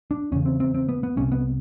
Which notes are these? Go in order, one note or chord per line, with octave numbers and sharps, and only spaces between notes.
D4
E2 C#3 C#4
C4
C4
C4
B3
B3
C2 C3 C#4
B3